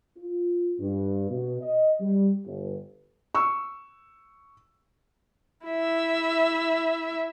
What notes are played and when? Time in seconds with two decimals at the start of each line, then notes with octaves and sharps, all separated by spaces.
0.17 F4
0.79 G2
1.31 B2
1.61 D#5
2.00 G3
2.46 G1
3.35 C#6 E6
5.66 E4 E5